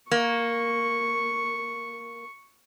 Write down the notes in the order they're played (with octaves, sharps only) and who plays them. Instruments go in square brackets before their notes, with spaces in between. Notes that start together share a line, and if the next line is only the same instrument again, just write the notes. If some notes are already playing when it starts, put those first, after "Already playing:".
[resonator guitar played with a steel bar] A#3 [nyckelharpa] C#6